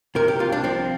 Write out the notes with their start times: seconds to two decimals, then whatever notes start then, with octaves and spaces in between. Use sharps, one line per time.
0.15 C3 A#4
0.28 G4
0.39 C2 F4
0.52 D4
0.64 F3 C4